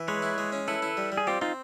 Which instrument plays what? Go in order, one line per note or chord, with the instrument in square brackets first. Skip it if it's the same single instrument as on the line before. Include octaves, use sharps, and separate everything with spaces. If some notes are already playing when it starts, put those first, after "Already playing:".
Already playing: [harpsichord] E3
[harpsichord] G#3 [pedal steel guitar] B4 C#5
[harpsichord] E4
G#3
C#4
[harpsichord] E4 [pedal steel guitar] A4 B4
[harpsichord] E4
G3
G3
[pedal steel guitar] G#4
[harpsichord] C4 [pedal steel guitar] F4 G4
[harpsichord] C4 [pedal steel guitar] D#4 F4